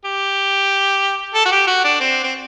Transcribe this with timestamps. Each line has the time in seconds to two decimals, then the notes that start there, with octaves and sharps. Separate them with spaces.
0.05 G4
1.35 A4
1.46 F#4
1.52 G4
1.67 F#4
1.84 D4
2.01 C4
2.24 C4